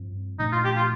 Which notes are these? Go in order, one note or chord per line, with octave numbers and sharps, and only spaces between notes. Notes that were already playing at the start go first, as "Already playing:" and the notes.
Already playing: G2 F3 C4
A#2 F3 A3 D4 D#4
F4
G4
F4